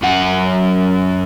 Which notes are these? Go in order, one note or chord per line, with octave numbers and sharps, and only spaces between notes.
F#2 F#5